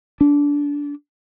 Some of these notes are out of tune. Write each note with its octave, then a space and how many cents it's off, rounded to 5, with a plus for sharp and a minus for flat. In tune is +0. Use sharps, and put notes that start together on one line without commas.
D4 -20